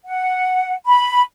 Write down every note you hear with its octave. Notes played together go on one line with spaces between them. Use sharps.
F#5
B5